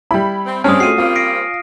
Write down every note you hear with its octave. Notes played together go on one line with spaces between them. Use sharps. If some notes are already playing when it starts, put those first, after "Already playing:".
G3 E4 B5
C4
G2 G#3 C4 C#4 A5 D#6 F6
A3 F4 F#4 C7 D#7
G3 A#3 C4 F4
A#6 C7 D7